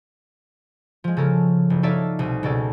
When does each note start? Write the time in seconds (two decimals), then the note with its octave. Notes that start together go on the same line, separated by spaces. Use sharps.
1.04 F3 G#3
1.17 C#3 C#4 A4 A#4
1.70 F#1
1.83 D#4 A4 C#5 D5 E5 F5
2.19 C2 B2 D#6
2.43 C#2 B2 C#4 A4 D5